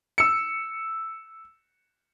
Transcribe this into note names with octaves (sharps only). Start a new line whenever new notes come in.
E6 C#7